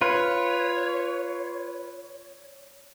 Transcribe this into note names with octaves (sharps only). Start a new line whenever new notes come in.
F4 B4 C#5